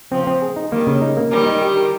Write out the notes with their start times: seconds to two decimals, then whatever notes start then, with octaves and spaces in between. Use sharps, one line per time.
0.12 C#3 F3 C4
0.27 C4
0.42 G#4
0.56 D#4
0.72 D#3 G3 A#3
0.87 C#3
1.01 D#4
1.17 A#3
1.31 D#3 G3 A#4
1.46 D#4
1.62 G4
1.77 A#4